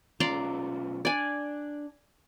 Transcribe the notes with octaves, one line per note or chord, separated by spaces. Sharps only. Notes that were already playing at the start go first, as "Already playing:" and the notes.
B1 C#4 F4 D5 A#5 C6
D4 D5 G#5